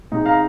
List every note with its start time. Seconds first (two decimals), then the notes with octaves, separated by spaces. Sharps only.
0.12 C3 G#3 D#4
0.26 F5 A#5